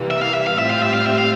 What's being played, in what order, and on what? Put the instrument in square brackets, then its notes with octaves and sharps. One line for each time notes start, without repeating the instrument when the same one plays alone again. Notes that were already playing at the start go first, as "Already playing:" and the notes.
Already playing: [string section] C3 E3 G3 A#3
[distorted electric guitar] E5
F5
E5
F5
[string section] A2 G3 C4 F4 [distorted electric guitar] E5
[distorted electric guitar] F5
E5
F5
E5
F5